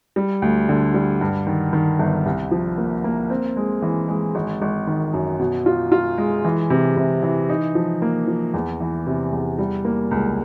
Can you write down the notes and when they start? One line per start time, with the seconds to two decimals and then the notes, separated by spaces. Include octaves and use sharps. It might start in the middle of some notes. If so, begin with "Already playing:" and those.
0.16 G3
0.42 D2
0.69 D3
0.94 G3
1.21 G2
1.47 D#3
1.73 D#3
1.99 G1
2.26 C2
2.51 F3
2.78 A#3
3.04 A#3
3.30 C4
3.56 G#3
3.82 E3
4.08 G#3
4.35 G#1
4.62 G#1
4.87 D#3
5.13 F#2
5.39 B2
5.66 F4
5.92 F4
6.18 G#3
6.45 E3
6.70 C3
6.97 C3
7.23 E3
7.49 D#4
7.75 F3
8.02 A#3
8.27 F3
8.54 E2
8.81 E3
9.07 C3
9.33 E2
9.59 G3
9.85 A#3
10.11 C#2